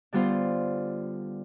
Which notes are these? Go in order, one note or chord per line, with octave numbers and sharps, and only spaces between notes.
D3 G3 B3 F4 C5